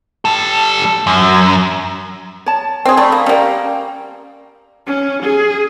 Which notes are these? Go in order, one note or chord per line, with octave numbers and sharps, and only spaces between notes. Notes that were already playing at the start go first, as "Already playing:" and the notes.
G3 A4
F#2
C#5 A5
C4 G#4
A3 D5 B5
A#3
G3 A#3 C#4 G5
C#4
G#4